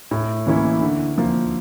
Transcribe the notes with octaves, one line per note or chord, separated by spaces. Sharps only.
A2
E3 A#3 C#4 E4
D3
F3 A#3